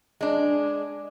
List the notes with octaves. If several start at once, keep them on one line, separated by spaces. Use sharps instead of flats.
G#3 D4